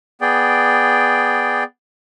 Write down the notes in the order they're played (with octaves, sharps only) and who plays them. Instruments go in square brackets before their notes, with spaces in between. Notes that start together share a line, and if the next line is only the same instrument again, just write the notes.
[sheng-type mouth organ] B3 G#4 D5 G5